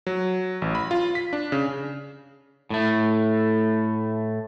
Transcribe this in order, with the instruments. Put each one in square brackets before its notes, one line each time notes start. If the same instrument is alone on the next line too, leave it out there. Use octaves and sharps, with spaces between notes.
[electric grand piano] F#3
A1
B5
F4
B6
D4
C#3
[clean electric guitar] A2 A3